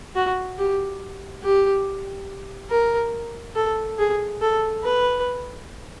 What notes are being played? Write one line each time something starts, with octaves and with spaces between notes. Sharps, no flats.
F#4
G4
G4
A#4
A4
G#4
A4
B4